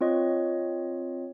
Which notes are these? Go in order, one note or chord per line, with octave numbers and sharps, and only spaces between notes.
C4 F4 C#5 D#5